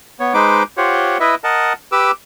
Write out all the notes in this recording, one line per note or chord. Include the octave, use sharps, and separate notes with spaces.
B3 C#5
G#3 D#4 B4 C5 D6
F4 G4 C5 C#5 F#5
E4 B4 D#5 E5
A#4 D#5 F#5 A5
G4 B4 D6 E6